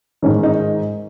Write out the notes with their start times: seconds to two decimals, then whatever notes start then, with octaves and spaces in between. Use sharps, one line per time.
0.22 G#2 D#3 C#4
0.43 D#4